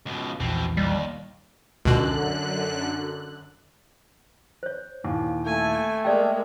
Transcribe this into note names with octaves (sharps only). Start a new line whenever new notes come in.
C#2 B2
A#1 E2 B2 E3 C4
D#2 G3
C#2 F#2 B2 D3 F#6
C5 C#5
D#2 A#2 E3
A3 G#5
G#3 A#3 D5 E5 G5